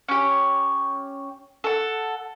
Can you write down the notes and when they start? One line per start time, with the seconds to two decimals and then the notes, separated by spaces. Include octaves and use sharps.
0.08 C#4 G4
1.64 A4 F#5